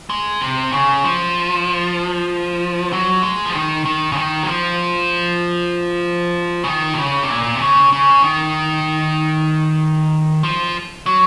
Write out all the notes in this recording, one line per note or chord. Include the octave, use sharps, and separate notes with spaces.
G#3
C3
C#3
F3
F#3
G#3
F3
D#3
D#3
C#3
D#3
F#3
F3
C#3
D#3
C3
C#3
C3
A#2
C3
C#3
C#3
D#3
F3
F#3